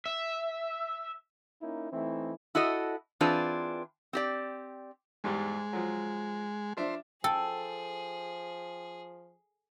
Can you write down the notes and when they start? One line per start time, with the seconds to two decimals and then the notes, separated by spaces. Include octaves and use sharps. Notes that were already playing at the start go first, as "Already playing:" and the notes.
0.06 E5
1.62 A#3 C#4 D#4 E4
1.92 E3 A3 C4 D#4 E4
2.55 E4 F#4 A4 D#5
3.21 E3 C4 D4 F4 G#4 B4
4.13 C4 G4 D5
5.24 E2 G#2 G3 G#3
5.73 F3 F#3
6.77 F3 D4 C5 E5
7.24 F3 G#4 A4 G5